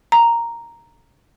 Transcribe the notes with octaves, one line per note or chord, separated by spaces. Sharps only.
A#5